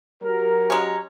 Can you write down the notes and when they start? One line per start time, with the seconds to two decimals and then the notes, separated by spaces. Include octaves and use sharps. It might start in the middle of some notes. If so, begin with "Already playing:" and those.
0.23 F#3 G4 A#4
0.70 G#3 C#4 A#5